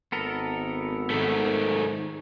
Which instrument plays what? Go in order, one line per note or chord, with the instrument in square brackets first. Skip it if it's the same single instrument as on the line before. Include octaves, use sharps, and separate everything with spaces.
[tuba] G#1 [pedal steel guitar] B3 A4 A#4
[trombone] G#2 [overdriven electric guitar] D#3 A3